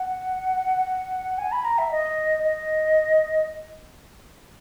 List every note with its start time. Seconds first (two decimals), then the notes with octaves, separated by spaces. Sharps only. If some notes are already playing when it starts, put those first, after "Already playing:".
Already playing: F#5
1.38 G#5
1.52 B5
1.64 A#5
1.78 E5
1.91 D#5
2.43 D#5